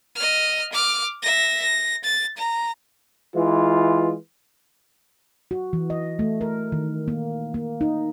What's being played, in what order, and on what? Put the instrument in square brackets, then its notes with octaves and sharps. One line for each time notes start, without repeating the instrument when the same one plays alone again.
[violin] D#5 F6
D6 F6
E5 A#6
A#6
A6
A#5
[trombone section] E3 G#3 F4
[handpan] F#4
E3
D#5
A3
A#4
D#3
A#3
A#3
D#4